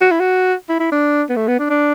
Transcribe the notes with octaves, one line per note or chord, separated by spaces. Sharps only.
F#4
E4
F#4
E4
E4
D4
B3
A3
B3
D4
D4